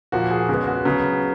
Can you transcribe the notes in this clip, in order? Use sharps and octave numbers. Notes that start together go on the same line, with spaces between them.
A#2 F3 A#3 F#4
G#4
C#3 G#3 B3 F#4
F#4
C#3 F#3 B3